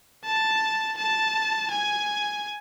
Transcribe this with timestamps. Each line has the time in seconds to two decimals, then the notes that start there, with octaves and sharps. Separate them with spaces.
0.25 A5
0.98 A5
1.71 G#5